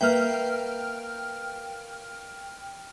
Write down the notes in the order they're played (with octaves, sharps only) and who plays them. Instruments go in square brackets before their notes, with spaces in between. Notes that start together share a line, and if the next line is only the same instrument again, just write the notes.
[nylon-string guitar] A#3 B4 E5 [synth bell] G5 F6